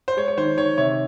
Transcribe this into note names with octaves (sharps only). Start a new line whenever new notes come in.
C5
G#3 C#5
C#5
D#3 C5
D#3 C#5
C3 C#5